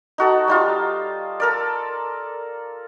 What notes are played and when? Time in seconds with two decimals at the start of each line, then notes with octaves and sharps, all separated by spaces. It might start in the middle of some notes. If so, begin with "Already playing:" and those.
0.18 D#4 F#4 A4
0.48 G3 D#4 F4
1.40 A4 A#4 D5